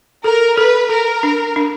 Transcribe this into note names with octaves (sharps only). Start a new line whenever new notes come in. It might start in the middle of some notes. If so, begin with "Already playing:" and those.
A4 A#4
A4 B4
A4 A#4
D4
D4